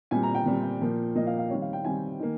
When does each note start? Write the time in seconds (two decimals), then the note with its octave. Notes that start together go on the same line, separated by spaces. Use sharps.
0.11 A#2 G3 C4 G#5
0.23 A#5
0.35 G5
0.46 A#2 G3 C4
0.81 A#2 F3 A#3
1.15 A#2 F3 A#3 D#5
1.27 F5
1.39 F5
1.50 D#3 G3 C4 C#5
1.62 F5
1.73 G5
1.84 D#3 G3 C4 G#5
2.20 D#3 A#3